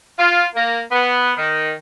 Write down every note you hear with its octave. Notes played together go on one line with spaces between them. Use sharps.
F4
A#3
B3
D#3